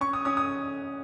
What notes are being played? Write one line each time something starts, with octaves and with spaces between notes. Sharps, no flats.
C#4 C#6
D#6
C#4 D#6
D#6